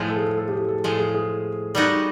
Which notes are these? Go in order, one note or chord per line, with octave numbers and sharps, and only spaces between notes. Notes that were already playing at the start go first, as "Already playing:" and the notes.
Already playing: A2 F3 G#3
A4
G#4
A4
A4
G4
G#4
A4
A2 F3 G#3 A4
G#4
G#4
G3 B3 D#4 F#4